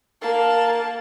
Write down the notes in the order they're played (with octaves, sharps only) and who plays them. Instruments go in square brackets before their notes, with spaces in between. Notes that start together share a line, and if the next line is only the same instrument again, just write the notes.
[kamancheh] A#3 A5